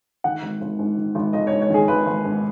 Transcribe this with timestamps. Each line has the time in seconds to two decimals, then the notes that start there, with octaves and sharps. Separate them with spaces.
0.24 D#3 F#5
0.42 G#1
0.61 G#1
0.79 G#2
0.97 D#3
1.15 G#1
1.33 G#1 D#5
1.47 G#2 C#5
1.62 C#5
1.70 D#3 G#4
1.88 G#1 B4
2.06 G#1
2.25 G#2